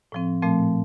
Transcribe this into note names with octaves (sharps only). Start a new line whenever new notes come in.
A2 F3 C4
A#2 F3 A3 C4